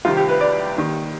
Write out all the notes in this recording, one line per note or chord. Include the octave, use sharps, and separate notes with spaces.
C2 C3 D#3 F4
G4
B4
D5
D#2 D#3